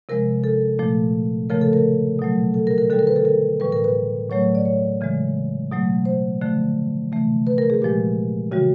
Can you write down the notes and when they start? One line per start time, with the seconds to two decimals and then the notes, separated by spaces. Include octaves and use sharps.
0.09 C3 F3 G#3 A#4
0.44 A4
0.79 A#2 F3 A3
1.50 C#3 F3 A3 A#4
1.61 A4
1.73 A#4
2.19 B2 F#3 A3
2.54 A4
2.67 A#4
2.78 A#4
2.90 D3 G3 A4
2.99 A#4
3.07 B4
3.16 A4
3.25 A#4
3.60 A2 E3 G3 B4
3.72 A#4
3.84 B4
4.30 A2 F#3 A3 C#5
4.55 D5
4.66 C#5
5.01 C#3 E3 G#3
5.72 B2 F#3 A3
6.05 C5
6.41 D3 F3 A3
7.12 C3 E3 A3
7.47 B4
7.58 A#4
7.70 G#4
7.82 A#2 F3 G#3 G4
8.52 C#3 E3 G3 F#4